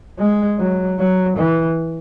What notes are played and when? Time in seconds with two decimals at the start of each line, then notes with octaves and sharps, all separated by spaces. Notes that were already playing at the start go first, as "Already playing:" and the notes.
0.19 G#3
0.59 F#3
0.99 F#3
1.37 E3